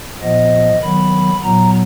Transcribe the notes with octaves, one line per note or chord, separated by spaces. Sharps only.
A#2 F3 B3 D#5
D#3 F#3 B3 B5
A#2 F#3 B3 A#5